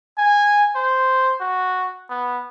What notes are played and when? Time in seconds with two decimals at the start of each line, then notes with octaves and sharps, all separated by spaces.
0.18 G#5
0.75 C5
1.40 F#4
2.10 B3